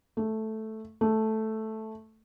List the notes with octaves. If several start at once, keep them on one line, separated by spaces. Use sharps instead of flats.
A3
A3